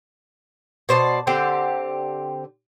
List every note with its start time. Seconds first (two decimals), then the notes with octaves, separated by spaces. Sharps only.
0.89 B2 C5 D5 A5
1.27 D3 C4 G4